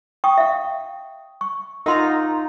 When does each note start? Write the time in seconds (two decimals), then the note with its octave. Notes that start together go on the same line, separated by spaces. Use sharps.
0.24 G5 C#6 D#6
0.38 E5 F5
1.41 C#6
1.86 D#4 F4 A#4 F#5 A#5 C6